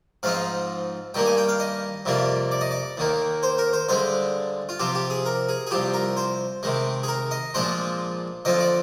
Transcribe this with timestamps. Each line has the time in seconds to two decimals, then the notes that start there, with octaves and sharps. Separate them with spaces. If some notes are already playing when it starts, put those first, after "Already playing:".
0.23 G#2 F3 C4 D#4 F5
1.14 G2 D#3 G3 A#3 G5
1.26 G#5
1.37 G5
1.49 F5
1.60 D#5
2.05 F2 C3 G3 A#3 F4
2.52 D5
2.61 D#5
2.71 D5
2.97 D#2 D#3 A#3
3.43 C5
3.58 A#4
3.73 C5
3.89 G2 D3 G#3 C5
4.69 F4
4.79 C3 F3 C4 G4
4.95 G4
5.10 G#4
5.26 A#4
5.49 G#4
5.67 G#4
5.71 C2 C3 F3 G4
5.94 A#4
6.17 C5
6.63 C3 D#3 G#3
7.03 G#4
7.08 A#4
7.31 D#5
7.54 A#2 F3 G#3 D4 C5
8.45 D3 F3 C4 F4 D#5
8.60 D5